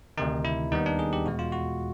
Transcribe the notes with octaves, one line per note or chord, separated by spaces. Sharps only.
D2 C3 D#3 D#4
E4
D#2 D#3 G3 B3 D#4
D4
G#4
G4
E2 B2 G#3 F#4
F4
F#4